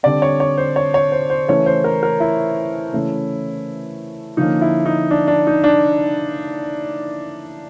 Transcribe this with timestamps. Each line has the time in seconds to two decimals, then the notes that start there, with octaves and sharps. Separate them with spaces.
0.03 D3 G3 C4 D5
0.22 C#5
0.40 C#5
0.57 C5
0.76 C#5
0.94 C#5
1.12 C5
1.30 C5
1.48 C#3 E3 A3 C#4 C#5
1.66 C5
1.84 A#4
2.03 A#4
2.20 E4
2.92 C#3 E3 A3 C#4
4.37 D3 F3 A#3 C#4 D#4
4.61 E4
4.86 D#4
5.11 D4
5.28 D4
5.47 D#4
5.64 D4